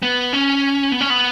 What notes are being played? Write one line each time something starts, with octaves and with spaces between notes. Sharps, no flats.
B3
C#4
B3
C#4
B3